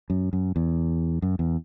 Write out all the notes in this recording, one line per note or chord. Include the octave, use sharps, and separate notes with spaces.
F#2
F#2
E2
F#2
E2